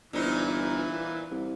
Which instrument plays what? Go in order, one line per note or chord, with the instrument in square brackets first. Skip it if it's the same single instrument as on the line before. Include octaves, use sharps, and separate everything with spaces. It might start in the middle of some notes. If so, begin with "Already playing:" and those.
[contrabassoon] G1 [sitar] A#2 C4 D#4 [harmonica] E3
[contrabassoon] C2